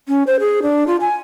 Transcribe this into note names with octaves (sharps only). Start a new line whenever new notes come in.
C#4
C5
G#4
D4
F4
G#5